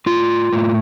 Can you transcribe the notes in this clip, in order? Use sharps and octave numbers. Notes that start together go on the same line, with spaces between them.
A2 F4
A2